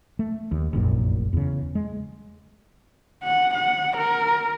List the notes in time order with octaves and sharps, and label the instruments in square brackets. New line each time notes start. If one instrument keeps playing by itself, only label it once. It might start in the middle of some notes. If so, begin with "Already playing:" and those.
[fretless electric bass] A3
D#2
F1 A#1 F#2 A#2
E2 C#3
G#3
[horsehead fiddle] F#5
F#5
A#4